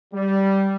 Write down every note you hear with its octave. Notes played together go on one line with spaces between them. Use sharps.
G3